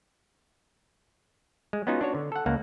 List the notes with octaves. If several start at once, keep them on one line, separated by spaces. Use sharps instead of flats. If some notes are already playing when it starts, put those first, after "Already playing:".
G#3
B3 C#4 D#4 F4 F#4
D4 F#4 C#5
D3
A4 F#5
C#2 A#3 F#5 A5